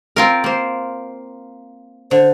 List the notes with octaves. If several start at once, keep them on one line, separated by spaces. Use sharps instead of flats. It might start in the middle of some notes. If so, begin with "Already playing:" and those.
C4 F4 A#4
A#3 C5
D3 C5